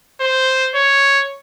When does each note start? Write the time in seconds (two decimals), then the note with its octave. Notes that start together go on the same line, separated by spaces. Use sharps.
0.21 C5
0.75 C#5